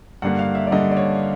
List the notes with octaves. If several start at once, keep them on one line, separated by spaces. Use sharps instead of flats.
G2 D3 G3 A#3 F#5
F5
E5
D5
G2 D3 G3 A#3 D#5
D5
C#5